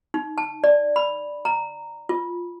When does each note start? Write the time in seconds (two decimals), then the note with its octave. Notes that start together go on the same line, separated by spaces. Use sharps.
0.14 D#4
0.38 A5
0.64 D5
0.96 B5
1.45 A#5
2.09 F4